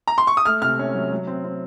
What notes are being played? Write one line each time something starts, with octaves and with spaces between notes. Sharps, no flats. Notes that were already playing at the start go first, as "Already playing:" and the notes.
A#5
C6
C#6
D#6
A3 F6
C3 F6
C#4
F#3
F#3
C4
C4